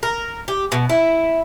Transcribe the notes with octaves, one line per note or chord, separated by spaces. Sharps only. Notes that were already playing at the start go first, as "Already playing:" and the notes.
A#4
G4
B2
E4